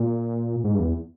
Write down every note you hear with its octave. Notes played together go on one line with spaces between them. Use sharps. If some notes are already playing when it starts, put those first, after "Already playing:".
Already playing: A#2
G#2
G2
E2